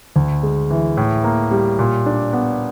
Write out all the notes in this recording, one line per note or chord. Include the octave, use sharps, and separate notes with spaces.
D2
G#3
E3
A2
A#3
G3
A#2
D4
B3